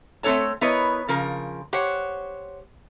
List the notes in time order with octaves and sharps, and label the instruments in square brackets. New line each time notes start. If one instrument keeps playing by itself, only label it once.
[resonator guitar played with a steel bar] A3 C4 D4 A4 C#5 A5
B3 E4 A#4 B4 C#5 D#5
C#3 F3 A#4
G4 C5 C#5 F#5